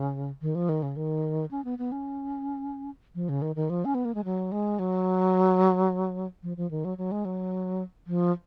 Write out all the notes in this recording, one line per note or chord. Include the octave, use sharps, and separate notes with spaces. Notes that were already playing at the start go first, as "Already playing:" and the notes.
Already playing: C#3
D#3
F3
D#3
C#3
D#3
C#4
B3
B3
C#4
F3
C#3
D#3
D#3
F3
C#4
B3
A#3
G#3
F#3
G#3
F#3
F3
F3
D#3
F#3
F#3
G#3
F#3
F3